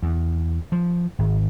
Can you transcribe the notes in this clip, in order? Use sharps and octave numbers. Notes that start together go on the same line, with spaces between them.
E2
F3
G#1